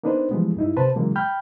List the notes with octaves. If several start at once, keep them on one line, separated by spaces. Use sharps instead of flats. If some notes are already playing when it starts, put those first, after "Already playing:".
A#3 B3 D4 D#4 B4 C5
E3 F3 G3 G#3 B3
G2 D#4 E4
C3 B4 C5 A5
C#3 E3 F#3 G#3 A#3
G5 B5 F6 G6